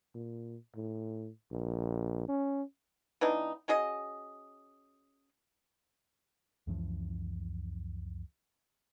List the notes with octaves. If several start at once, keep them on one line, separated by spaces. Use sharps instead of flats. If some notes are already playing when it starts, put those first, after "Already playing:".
A#2
A2
A#1
C#4
E3 B3 D4 D#4
C#4 F#4 G#4 D#5
C#2 F#2 E3 F3